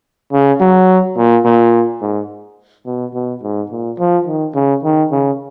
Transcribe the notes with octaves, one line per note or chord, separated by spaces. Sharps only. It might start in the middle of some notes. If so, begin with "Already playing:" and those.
C#3
F#3
A#2
A#2
G#2
B2
B2
G#2
A#2
F3
D#3
C#3
D#3
C#3